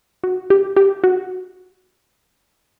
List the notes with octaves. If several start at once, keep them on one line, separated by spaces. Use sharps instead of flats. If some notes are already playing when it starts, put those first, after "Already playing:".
F#4
G4
G4
F#4